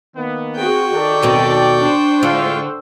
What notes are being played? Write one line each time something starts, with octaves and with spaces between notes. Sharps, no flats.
D#3 A#3 B3
C4 F#4 G#4 G5 C#6
D#3 A4 D5
D#2 B2 C4
D4 C5
A2 D3 G#3 F4